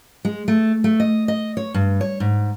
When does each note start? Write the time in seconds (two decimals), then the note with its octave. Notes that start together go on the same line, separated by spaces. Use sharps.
0.25 G#3
0.48 A3
0.84 A3
1.00 D#5
1.28 D#5
1.57 C#5
1.74 G2
2.01 C#5
2.20 G#2